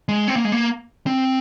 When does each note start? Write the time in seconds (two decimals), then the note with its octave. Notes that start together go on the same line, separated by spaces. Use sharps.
0.09 G#3
0.28 C4
0.36 A#3
0.45 G#3
0.52 A#3
1.07 C4